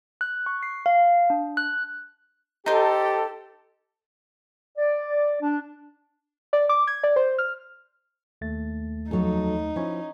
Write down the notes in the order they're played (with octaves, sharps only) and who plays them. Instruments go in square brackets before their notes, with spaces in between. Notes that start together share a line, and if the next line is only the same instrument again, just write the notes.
[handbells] F#6
C#6
C7
F5
D4
F#6
[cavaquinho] D#4 C5 [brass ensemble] G4 [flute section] A4
[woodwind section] D5
D4
[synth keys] D5
D6
G#6
D5
C5
F6
[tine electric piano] D#2 A3 A6
[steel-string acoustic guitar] F2 F#3 A4 [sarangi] D#4
[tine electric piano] F3 E4 C#5 [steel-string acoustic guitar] C#4